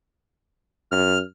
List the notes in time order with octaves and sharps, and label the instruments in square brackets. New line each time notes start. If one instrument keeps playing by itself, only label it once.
[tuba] F#2 [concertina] F6